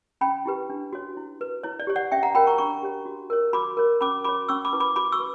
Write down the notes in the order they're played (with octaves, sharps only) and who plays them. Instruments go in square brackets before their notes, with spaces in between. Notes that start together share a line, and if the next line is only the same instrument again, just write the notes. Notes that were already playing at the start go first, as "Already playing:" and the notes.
[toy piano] C#4 G5 B5
E4 G4 B4
D4
F#4 C#5
E4
B4
E4 C#5
D5
G4 C#5
D5 F#5
C#4 E5 G5
F#5 A#5
F#4 A#4 C#5 G5 B5
A#5 C#6
D4 A#5 C#6
G4 C#5
F#4
A#4 C#5
F#4 B5 D6
A#4 C#5
C#4 B5 D6
F#4 C#5 B5 D6
C#4 C#6 E6
B5 D6
E4 B4
B5 D6
F#4 B5 D6
C#6 E6
B4